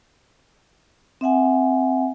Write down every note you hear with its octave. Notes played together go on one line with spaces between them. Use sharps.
C4 E5 F#5 G#5